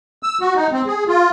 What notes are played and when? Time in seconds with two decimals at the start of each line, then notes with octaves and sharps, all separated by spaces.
0.23 E6
0.41 F#4
0.56 D#4
0.72 C4
0.87 G#4
1.07 F4